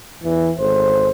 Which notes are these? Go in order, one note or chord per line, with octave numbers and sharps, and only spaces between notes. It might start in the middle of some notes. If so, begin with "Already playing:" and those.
E2 E3
G#1 A4 C5